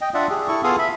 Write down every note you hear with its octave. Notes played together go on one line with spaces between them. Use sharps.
D#5 G5
D4 F4 D5 E5 F#5
G4 G#4
E4 A4 C#6
B3 F4 G#4 A4 F5 D#6
E5 B5